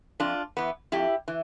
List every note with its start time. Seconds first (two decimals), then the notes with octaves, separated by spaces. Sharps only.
0.20 F2 D4 F4
0.57 E3 B3
0.92 F2 E4 G4
1.28 E3